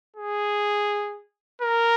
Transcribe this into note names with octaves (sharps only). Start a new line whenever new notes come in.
G#4
A#4